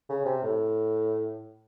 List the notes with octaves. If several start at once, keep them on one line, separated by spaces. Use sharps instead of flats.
C#3
C3
A2